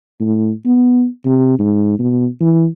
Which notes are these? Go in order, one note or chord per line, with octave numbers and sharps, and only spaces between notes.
A2
B3
C3
G#2
B2
E3